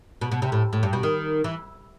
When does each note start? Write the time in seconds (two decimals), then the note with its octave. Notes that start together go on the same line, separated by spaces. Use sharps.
0.21 B2
0.32 B2
0.42 C3
0.52 A2
0.73 A2
0.83 G2
0.93 B2
1.03 D#3
1.44 E3